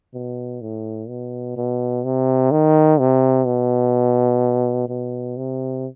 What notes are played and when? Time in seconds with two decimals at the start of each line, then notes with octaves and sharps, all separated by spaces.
0.14 B2
0.62 A2
1.09 B2
1.57 B2
2.04 C3
2.51 D#3
3.00 C3
3.46 B2
4.89 B2
5.37 C3